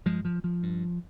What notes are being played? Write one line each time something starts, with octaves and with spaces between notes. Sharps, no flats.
G2 F3 G#3
F3
F3
G2